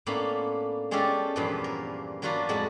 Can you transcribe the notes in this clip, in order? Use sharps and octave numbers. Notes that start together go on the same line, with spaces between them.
A2 A#3 B3 C#4 D4 B5
G#3 C#4 D4 F4 G4 A4
E2 G2 A#2 F3 B3 B4
A#4
F#3 A#3 D4 F4 F#4 B4
F2 A2 G#3 F#4 F#5 A5